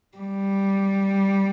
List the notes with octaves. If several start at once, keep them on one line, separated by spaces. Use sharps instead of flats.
G3